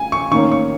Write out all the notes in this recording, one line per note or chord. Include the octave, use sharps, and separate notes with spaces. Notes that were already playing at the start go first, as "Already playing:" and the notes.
Already playing: G#5
C#6
D#3 A#3 C#4 C#6
C#6